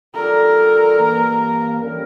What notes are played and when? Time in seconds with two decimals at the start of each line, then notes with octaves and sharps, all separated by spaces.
0.15 D3 G3 D4 F4 A4 A#4
0.98 G2 E3 A#3
1.82 A2 G3 C#4 G4 A#4